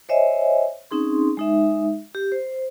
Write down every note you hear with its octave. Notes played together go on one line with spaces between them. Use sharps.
C5 C#5 D#5 E5 G#5
C4 C#4 D#4 G#4 C6
G#3 D#4 E5
G4
C5